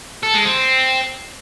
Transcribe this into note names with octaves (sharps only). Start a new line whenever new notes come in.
A4
G#3
C4